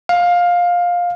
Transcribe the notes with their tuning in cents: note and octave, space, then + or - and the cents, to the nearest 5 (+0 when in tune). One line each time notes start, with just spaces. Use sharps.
F5 +15